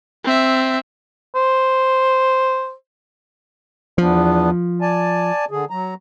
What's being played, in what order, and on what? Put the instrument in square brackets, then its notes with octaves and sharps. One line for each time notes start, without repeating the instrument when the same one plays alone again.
[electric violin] C4 E5
[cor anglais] C5
[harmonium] E2 B3 D4 [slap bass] F3
[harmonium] D5 G#5 A5
D3 G#4
F#3 A#5